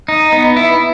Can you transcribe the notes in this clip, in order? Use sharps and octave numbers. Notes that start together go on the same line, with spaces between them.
D#4
B3
E4